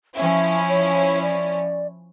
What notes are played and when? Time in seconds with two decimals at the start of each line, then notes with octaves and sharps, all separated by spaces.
0.16 F3 C#4 E4 E5
0.69 C#5
1.22 D5